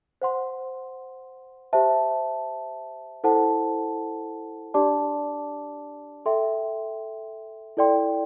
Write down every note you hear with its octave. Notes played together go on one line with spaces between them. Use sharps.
C5 F#5 C6
G4 C5 E5 A5
E4 A4 C5 F#5 A5
D4 G4 D5 A5 D6
A4 E5 G5 C6
E4 A4 D5 G5 C6